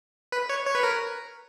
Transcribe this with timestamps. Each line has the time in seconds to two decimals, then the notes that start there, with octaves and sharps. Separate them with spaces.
0.32 B4
0.49 C#5
0.66 C#5
0.75 B4
0.83 A#4